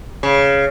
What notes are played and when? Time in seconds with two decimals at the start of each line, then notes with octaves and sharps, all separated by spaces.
0.23 C#3